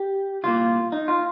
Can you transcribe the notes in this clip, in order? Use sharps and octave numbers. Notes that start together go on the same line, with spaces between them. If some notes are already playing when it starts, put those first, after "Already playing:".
Already playing: G4
C2 A#2 A#3 F4
D#4
F4